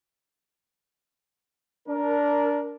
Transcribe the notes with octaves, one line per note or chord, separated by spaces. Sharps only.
D4 A#4